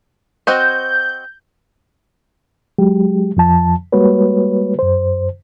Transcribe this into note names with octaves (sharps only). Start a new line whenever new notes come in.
C4 F#4 D#5 G6
F#3 G#3 G4
F2 F3 A5
G3 G#3 A#3 F#4 B4 C#5
F#2 C5